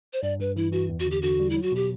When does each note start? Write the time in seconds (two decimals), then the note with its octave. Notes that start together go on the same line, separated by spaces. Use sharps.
0.13 C5
0.23 G2 D5
0.40 G2 B4
0.57 E3 E4
0.72 E3 F#4
0.89 E2
1.00 F#4
1.06 D3
1.11 G4
1.22 D3 F#4
1.40 G3
1.50 E4
1.56 F#3
1.62 F#4
1.72 B2 G4